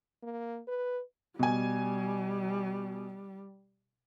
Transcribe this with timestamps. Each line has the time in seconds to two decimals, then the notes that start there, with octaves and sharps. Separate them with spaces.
0.23 A#3
0.68 B4
1.39 B2 G3 G#5